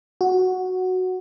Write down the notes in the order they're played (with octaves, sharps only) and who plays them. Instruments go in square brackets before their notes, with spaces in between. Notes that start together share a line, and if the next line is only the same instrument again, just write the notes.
[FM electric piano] F#4